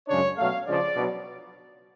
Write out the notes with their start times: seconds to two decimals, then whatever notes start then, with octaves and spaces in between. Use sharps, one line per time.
0.08 F#2 C#3 G#3 D4 C#5
0.37 B2 F#3 A3 F5
0.66 C#3 F3 G#3 D4 D5
0.95 B2 F#3 B3 D4